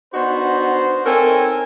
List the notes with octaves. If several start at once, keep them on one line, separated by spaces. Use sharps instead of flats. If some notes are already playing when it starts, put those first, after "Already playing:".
B3 D4 D#4 F#4 C5
C4 D#4 A4 A#4 C#5 G#5